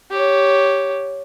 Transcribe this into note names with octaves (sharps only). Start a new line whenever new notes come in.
G4 C#5